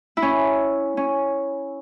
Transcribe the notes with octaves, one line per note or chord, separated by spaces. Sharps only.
E4
C#4
C#4